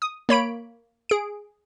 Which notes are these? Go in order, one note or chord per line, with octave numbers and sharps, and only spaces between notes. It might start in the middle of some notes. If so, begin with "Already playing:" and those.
D#6
A#3 C#5 B5 D7
G#4 D7